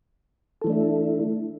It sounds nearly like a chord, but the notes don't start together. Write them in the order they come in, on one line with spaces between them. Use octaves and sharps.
A4 E3 A3 D4 E4